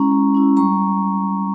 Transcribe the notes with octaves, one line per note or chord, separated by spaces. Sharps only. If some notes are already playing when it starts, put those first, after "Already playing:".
Already playing: G#3 C#4 E4 A#5 C#6
G#3
C#4 E4
G3 A#5 C#6